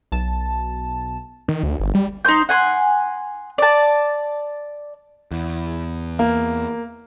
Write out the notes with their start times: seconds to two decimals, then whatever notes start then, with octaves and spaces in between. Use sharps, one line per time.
0.12 B1 A5
1.48 D#3
1.63 D2
1.80 G1
1.95 G3
2.25 D#4 C5 C6 G6
2.49 F#5 G#5 C6
3.58 D5 A5
5.31 E2
6.19 A#3